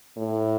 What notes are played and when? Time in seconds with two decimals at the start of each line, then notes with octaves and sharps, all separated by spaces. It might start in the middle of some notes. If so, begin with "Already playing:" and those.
0.17 A2